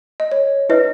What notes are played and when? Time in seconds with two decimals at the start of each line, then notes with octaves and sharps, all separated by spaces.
0.20 D#5
0.32 C#5
0.69 E4 B4 D#5 E5